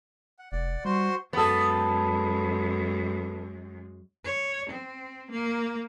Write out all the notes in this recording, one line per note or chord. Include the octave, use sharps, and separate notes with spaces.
F#5
F1 D5 F#5
G3 F#4 C5 C6
F#2 G#3 B3 A4
C#5
C4
A#3